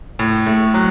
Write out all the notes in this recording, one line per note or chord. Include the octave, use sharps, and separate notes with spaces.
A2
A3
F#3